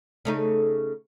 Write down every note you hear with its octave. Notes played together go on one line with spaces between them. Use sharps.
C#3 A3 D#4